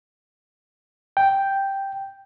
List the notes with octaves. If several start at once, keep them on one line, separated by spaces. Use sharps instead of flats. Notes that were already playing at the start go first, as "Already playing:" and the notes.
G5